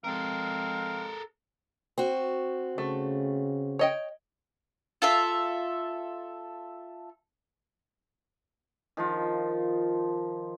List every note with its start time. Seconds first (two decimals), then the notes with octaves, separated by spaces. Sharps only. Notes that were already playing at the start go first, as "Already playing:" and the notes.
0.04 F3 G#3 C4 A4 A#4 F5
1.98 C4 F#4
2.78 C#3 A3
3.79 C#5 D#5 G5
5.02 F4 A4 E5
8.97 D#3 F3 F4